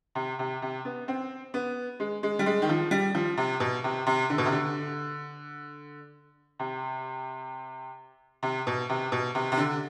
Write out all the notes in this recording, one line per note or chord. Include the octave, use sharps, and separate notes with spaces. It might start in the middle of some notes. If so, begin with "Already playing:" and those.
C3
C3
C3
B3
C4
B3
G#3
G#3
G3
G#3
D#3
F3
G3
F3
C3
B2
C3
C3
D3
B2
C3
D3
C3
C3
B2
C3
B2
C3
C3
D3